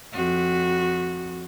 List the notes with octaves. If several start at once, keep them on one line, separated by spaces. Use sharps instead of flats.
F2 F#4